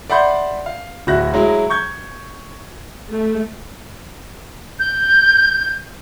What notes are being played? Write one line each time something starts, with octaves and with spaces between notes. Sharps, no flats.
D5 E5 F#5 B5 C6 G6
F5
D1 F#4 E5 F#6 A#6
F#3 G#3 E4
C#6 G6 G#6
A3
G6